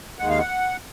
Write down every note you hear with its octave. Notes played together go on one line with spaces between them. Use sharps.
D#2 D#3 G#3 F#5
F5
F#5